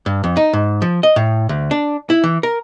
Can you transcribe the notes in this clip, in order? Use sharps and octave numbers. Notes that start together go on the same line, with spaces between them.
G2
F2
D#4
G#2
F3
D#5
A2
D2
D4
E4
E3
A#4